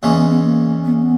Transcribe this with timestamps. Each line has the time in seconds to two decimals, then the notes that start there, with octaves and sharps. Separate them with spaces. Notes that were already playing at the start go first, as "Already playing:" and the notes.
0.03 E2 C#3 E3 G#3 A#3 C#4
0.16 B3
0.30 B3
0.44 A#3
0.85 B3
0.93 A#3
1.02 B3